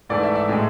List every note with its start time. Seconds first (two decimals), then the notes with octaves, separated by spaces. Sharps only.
0.09 G#2 E3 A3 D5
0.23 E5
0.36 E5
0.49 A2 G#3